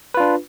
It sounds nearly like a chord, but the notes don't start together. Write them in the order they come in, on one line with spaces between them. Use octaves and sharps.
B4 F4 D4